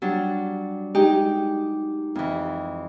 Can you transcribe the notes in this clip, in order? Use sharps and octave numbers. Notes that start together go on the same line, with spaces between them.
F#3 G3 D4
G#3 D#4 G4
F2 E3